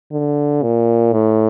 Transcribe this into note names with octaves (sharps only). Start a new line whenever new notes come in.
D3
A#2
A2